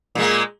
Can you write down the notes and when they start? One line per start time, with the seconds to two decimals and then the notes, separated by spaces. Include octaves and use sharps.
0.15 A#2
0.18 G#3
0.21 A#3